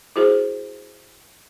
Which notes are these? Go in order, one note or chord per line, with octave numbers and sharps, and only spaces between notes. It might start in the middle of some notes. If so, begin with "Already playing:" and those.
E4 F#4 G#4 C5